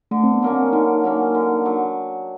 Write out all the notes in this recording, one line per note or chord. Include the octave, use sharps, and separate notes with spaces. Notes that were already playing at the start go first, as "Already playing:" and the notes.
D3 A3
C4
B3
F#3 A#3 C#4
C4
D3 D#4
F#3 A#3 C#4
D3
F#3